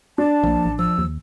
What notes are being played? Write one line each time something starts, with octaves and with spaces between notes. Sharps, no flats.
D4 A5
A#1 F3 A#3
A1
F3 E6
D#2